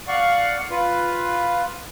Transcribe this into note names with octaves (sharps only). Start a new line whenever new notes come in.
D5 F5 F#5 C#6
F4 B4